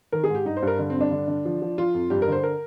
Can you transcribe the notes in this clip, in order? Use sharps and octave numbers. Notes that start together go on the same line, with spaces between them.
D#3 A#4
G#4
G#2
G4
G2 D#4
C5
G2 A#4
D3
C4
G2 D4
D3
D3
F3
F3
F3 F4
F2
G2 G4
A#4
D3 C5
A#4